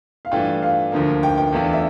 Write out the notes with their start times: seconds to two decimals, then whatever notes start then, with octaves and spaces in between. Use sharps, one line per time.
0.25 F5
0.31 G2 E3 A3 D4 F4 G5
0.62 F5
0.92 D2 D3 F3 A#3
1.23 G5
1.38 G5
1.52 E2 E3 A3 D4 F4
1.73 E5